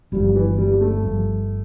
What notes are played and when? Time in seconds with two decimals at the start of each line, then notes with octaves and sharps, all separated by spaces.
0.12 G1 G2 F3 G3
0.35 E3
0.58 G3
0.81 A3
1.03 G1 G2 F3